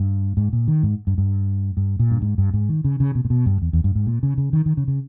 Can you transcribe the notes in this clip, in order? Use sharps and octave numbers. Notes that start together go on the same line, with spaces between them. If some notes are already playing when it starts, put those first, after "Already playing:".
Already playing: G2
G#2
A#2
D#3
G#2
G2
G2
G2
A#2
G2
G#2
G2
G#2
D#3
C#3
C#3
B2
A#2
B2
G2
E2
E2
G2
G#2
A#2
C#3
C#3
D#3
D#3
C#3
C#3